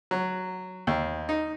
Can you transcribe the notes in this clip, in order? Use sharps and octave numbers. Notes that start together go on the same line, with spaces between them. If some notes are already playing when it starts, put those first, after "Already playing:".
F#3
D#2
D#4